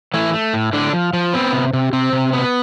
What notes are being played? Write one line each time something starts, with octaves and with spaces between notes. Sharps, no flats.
E3 A3 E4
A3
A2
A2 D3 D4
F3
F3
B3 C4
C3
C3
C3 C4
C3
B3